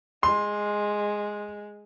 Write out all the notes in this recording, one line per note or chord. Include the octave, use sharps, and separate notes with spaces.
G#3 C6